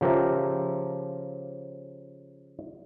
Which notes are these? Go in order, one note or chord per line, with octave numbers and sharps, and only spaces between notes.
C#3 F3 G4 A#4 E5